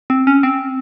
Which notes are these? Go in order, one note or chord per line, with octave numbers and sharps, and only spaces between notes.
C4
C#4
C4